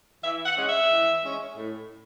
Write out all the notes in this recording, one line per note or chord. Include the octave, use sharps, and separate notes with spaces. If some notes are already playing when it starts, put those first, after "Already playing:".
E3 E5
F#5
G#3 C#4
E5
E3
G#3 C#4
A2